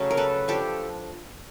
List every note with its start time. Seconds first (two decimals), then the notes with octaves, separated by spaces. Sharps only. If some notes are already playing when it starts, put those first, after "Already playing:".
Already playing: C#3 F#3 A3 C#4
0.11 A#4
0.17 A4 B4
0.48 F3 A3 D4 F4 G4 A4